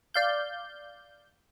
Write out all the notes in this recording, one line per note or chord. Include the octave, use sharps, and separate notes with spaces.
D5 F5 G6